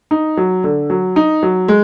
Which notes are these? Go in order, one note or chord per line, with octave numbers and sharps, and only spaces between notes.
D#4
F#3
D3
F#3
D#4
F#3
G#3